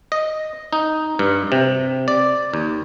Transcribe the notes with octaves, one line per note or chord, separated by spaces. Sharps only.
D#5
D#4
G2
C3
D5
D#2